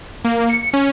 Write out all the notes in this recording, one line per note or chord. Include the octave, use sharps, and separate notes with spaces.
A#3
C#7
C#4